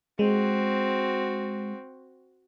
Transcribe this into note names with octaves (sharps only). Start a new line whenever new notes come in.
G#3 C4 F#4